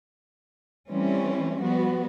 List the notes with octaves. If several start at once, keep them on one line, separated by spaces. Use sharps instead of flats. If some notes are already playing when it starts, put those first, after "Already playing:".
E3 G3 A3 C4 C#4
F3 G3 B3 F#4